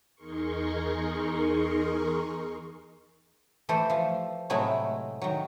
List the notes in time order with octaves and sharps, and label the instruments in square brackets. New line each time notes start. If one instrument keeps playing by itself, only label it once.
[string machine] E2 D#4 G#4 A#4 C6 C#6
[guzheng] E3 A3 G4 A4 C5
F3
A2 C3 F#3 G#3 A3 E4
D#3 F#3